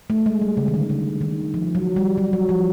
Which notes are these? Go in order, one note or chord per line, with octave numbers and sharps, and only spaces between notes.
A3
G#3
G3
C#3
D#3
D3
D3
D#3
F3
F#3
G3
F#3
F#3
F3